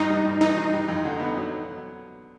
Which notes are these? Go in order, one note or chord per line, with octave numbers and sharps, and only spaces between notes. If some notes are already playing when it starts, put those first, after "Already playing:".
Already playing: G2 E3 D#4
G3
G2
E3 D#4
G2
G3
F2
D3
B3
F#3